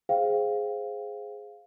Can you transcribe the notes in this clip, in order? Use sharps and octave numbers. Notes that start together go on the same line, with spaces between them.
G#4 C5 F5 G5